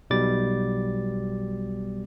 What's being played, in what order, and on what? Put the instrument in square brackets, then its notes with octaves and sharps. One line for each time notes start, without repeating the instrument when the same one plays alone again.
[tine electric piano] B1 B2 G3 D6 A6